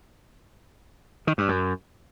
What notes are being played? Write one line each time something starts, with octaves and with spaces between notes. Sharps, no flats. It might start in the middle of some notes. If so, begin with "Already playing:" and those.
D#3
G2
F#2